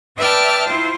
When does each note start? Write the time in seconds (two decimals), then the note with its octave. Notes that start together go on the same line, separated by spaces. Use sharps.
0.17 B4 D5 E5 G5 A5 F6
0.65 E4 F4 C5